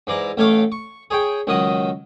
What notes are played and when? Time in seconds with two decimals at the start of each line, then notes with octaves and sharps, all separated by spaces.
0.07 G#2 E3 D5 A#5
0.37 A1 A3 C#5 F5 D6
0.72 C#6
1.11 G#4 C#5 G5
1.47 C#2 D#3 F#3 D#5 D#6